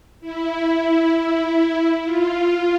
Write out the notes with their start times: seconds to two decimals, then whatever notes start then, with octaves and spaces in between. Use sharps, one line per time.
0.21 E4
2.04 F4